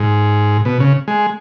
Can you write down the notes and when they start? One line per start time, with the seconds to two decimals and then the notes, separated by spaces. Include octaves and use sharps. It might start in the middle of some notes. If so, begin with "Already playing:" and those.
Already playing: G#2
0.65 B2
0.80 C#3
1.08 G#3